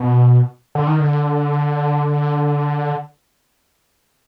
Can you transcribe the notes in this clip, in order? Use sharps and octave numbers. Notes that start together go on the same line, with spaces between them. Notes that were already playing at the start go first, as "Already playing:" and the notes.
Already playing: B2
D3
D#3
D3